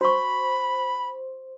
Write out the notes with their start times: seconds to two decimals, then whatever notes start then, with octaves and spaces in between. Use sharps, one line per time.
0.01 F#4 C5 B5 C#6